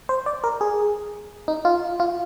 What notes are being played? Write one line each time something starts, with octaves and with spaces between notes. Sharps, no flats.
C5
D5
A#4
G#4
D#4
F4
F4